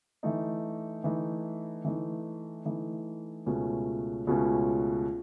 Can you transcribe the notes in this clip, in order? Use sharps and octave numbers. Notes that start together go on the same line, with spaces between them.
E3 A3 D#4
E3 A3 D#4
E3 A3 D#4
E3 A3 D#4
C#2 B2 A3 C#4
C#2 B2 A3 C#4